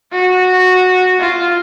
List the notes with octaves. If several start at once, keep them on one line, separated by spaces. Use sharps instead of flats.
F#4
F4